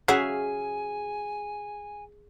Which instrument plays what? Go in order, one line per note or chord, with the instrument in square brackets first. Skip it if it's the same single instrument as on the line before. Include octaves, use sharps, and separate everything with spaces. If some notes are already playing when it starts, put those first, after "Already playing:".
[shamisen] C#3 F#3 F#4 [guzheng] G#4 E5 F5 [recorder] G#5